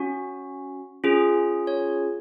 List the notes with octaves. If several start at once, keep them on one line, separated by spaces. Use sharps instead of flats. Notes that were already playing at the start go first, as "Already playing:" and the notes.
Already playing: C#4 F#4
C#4 F4 G#4
C#5